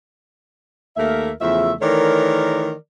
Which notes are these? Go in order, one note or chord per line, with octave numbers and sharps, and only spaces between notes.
D#2 A3 A#3 A#4 E5
E2 C#3 F3 A3 E5
D#3 E3 A3 A#4 C#5 D5